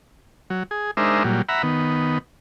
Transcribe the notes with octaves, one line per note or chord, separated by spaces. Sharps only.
F#3
G#4
G#3 D4 D#4 A#4 C5 E5
A#2 F#3 G3
E5 F#5 A#5 B5
D#3 B3